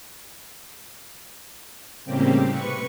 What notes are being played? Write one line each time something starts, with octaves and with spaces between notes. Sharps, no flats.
A2 C#3 G3 A#3 C4 G4
C3 B4 C#6 C#7